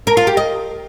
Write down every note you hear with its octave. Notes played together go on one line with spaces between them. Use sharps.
A#4
F4
G4
D#5